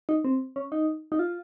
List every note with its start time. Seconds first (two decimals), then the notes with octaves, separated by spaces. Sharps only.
0.09 D#4
0.25 C4
0.56 C#4
0.72 D#4
1.12 D#4
1.19 F4